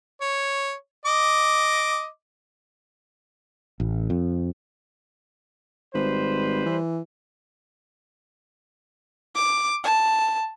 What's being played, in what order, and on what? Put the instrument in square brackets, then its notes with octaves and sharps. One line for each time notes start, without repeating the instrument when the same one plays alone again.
[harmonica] C#5
D#5 D6
[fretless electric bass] A1
F2
[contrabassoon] G#1 [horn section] G3 B4 C5
[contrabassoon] E3
[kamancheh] D6
A5